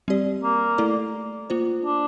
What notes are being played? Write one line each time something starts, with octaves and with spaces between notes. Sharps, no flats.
G3 C4 G4 D5
A#3
A3 E4 A4 D5
A#3 F4 C5
D4